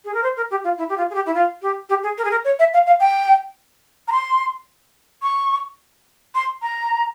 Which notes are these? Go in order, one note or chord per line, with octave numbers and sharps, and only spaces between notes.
G#4
A#4
C5
A#4
G4
F4
E4
G4
F4
G#4
G4
E4
F4
G4
G4
G#4
A#4
G#4
A#4
C#5
E5
F5
F5
G5
A#5
C6
C#6
C6
A#5